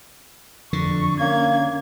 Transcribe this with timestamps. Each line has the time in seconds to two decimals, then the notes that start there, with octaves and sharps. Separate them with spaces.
0.73 F2 D3 C#6
1.20 A#3 C#4 G#6